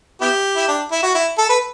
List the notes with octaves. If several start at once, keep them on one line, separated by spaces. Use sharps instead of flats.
B3 E4 G4
E4
D4
E4
F#4
E4
A4
B4